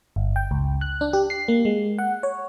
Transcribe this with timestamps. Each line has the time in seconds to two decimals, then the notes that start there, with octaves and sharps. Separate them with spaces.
0.16 G1
0.36 G5
0.51 C#2
0.81 F#6
1.01 D4
1.13 G4
1.30 C7
1.48 A#3
1.65 G#3
1.98 F#5
2.23 C#5